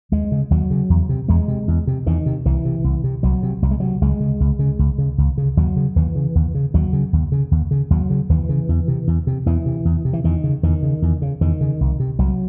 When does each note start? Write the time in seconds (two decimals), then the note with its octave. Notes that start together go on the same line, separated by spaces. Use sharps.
0.12 D#2 G#3
0.32 C#3
0.51 D#2 F#3
0.70 C#3
0.90 E2
1.09 C3
1.29 E2 G#3
1.48 C3
1.68 E2
1.87 C3
2.06 E2 D#3
2.26 C3
2.46 C2 E3
2.65 C3
2.84 C2
3.04 C3
3.23 C2 F#3
3.43 C3
3.62 C2 F#3
3.71 G#3
3.80 C3 F#3
4.01 C#2 G#3
4.20 C#3
4.40 C#2
4.59 C#3
4.79 C#2
4.98 C#3
5.18 C#2
5.38 C#3
5.57 D#2 F#3
5.77 C#3
5.96 D#2 E3
6.15 C#3
6.35 D#2
6.55 C#3
6.74 D#2 F#3
6.93 C#3
7.13 D#2
7.32 C#3
7.51 D#2
7.71 C#3
7.90 D#2 F#3
8.10 C#3
8.29 D#2 E3
8.49 C#3
8.69 E2
8.88 C3
9.07 E2
9.27 C3
9.46 E2 E3
9.66 C3
9.85 E2
10.05 C3
10.13 E3
10.24 E2 D#3
10.44 C#3
10.63 E2 D#3
10.83 C#3
11.02 E2
11.22 C#3
11.41 E2 D#3
11.61 C#3
11.81 C2
12.00 C3
12.19 C2 F#3